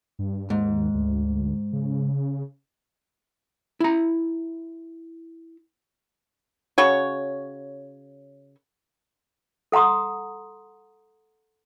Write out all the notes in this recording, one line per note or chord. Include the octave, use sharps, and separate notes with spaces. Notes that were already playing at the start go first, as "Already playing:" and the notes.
G2
D#2 G#2
D2
C#3
E4 A#5
C#3 F#4 C#5
A4 F#5 A#5 C6 D#6